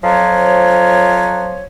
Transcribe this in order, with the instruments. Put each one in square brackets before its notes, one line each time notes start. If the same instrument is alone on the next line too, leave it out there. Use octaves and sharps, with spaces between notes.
[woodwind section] F2 F3 F#3 C#5